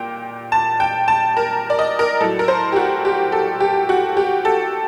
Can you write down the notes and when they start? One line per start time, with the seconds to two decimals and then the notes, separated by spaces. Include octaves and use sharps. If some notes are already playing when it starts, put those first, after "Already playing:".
Already playing: A#2 G5
0.52 A5
0.80 G5
1.08 A5
1.37 A#4
1.70 D5
1.79 D#5
1.99 A#4
2.21 A2 F#3 A4
2.39 A#4
2.48 C5
2.72 G4
2.76 F#4
3.05 G4
3.32 A4
3.60 G4
3.89 F#4
4.17 G4
4.45 A4